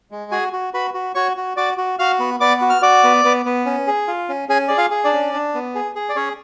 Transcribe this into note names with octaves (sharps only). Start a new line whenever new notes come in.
G#3
F#4 G#4 G#5
F#4
F#4 B4 B5
F#4
F#4 C#5 C#6
F#4
F#4 D5 D6
F#4
F#4 F5 F6
B3
B3 D5 D6
F#4
F6
F#4 D5 D6
B3
B3
B3
C#4
G#4
F4
C#4
C#4 G#4 G#5
G#4 D5
F4 F5
G#4
D4 D5
C#4
D4
B3
G#4
G#4
D5
C#4 G#4 C#5